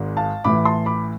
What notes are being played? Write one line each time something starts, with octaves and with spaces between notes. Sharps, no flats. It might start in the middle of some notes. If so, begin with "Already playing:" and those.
Already playing: G#1 G#2 G#3
F5 A5
A1 A2 E3 B5 D6
A5 C6
B5 D6